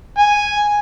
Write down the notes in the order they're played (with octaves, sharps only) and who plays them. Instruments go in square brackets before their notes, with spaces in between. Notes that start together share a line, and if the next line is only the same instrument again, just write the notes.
[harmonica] G#5